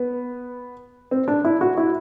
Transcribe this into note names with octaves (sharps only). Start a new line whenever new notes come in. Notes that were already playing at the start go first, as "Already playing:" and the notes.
Already playing: B3
C4
D4
E4
F#4
E4